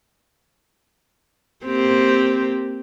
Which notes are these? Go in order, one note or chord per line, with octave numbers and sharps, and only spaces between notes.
A#3 C4 G4